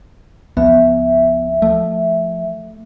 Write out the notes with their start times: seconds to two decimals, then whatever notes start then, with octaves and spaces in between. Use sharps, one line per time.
0.57 C#2 F3 B3 E5
1.62 F3 A3